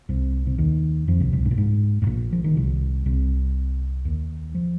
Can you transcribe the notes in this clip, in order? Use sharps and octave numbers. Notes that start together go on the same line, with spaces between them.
C2 C3
C3
D#2 D#3
F2 F3
C2 C3
C2 C3
G#2
A#2
G#2
G#2
A#1 A#2
F3
D#3
C2 C3
C2 C3
D#2 D#3
F3